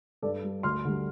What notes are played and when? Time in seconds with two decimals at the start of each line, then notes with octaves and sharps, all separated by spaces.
0.22 G2 A4 D5
0.43 G3
0.63 D2 C6 F6
0.85 D3 G3